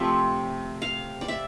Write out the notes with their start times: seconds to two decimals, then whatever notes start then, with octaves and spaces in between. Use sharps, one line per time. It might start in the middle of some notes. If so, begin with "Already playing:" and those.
Already playing: C3 F3 A3 C4 E5
0.82 F5
1.21 D5
1.28 E5